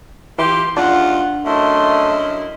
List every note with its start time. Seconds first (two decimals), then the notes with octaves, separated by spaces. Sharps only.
0.38 E3 E4 F4 G4 C6
0.77 D#2 G#3 D4 F4 F#5
1.46 F#2 A3 E4 D#5 C6